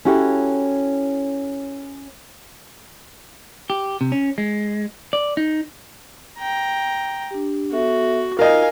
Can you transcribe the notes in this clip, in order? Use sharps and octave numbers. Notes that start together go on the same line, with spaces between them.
C#4 E4 F#4 G4 A4
G4
C3
C#4
G#3
D5
D#4
G5 A#5
D4 G4
B3 F#4 A4 E5
D#4 F4 A#4 D#5 F5 G#5